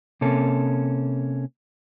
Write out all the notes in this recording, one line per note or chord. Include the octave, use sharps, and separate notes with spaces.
C3 A#3 C#4 A4